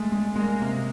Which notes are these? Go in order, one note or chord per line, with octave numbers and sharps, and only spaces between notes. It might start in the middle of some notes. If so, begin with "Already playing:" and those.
Already playing: G#3 A3
G#3
G#3 A#3
C3